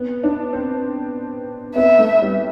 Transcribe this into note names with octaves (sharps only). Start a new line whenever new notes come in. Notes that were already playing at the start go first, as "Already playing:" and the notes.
Already playing: B3
D4
C4
B3 E5
A3
G3